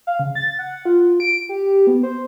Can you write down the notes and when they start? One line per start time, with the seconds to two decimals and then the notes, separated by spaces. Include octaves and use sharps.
0.07 F5
0.19 C#3
0.35 A6
0.59 F#5
0.85 F4
1.20 D7
1.49 G4
1.87 B3
2.03 C5